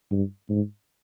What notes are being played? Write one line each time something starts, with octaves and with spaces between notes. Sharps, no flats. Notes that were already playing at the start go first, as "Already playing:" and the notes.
G2
G#2